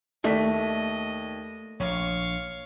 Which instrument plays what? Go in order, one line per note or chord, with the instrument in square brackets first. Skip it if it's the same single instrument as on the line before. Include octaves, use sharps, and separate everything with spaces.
[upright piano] D#2 D5 B6 [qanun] A3 [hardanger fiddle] D#5
[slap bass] A#1 [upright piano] C#5 [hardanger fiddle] F5 C#6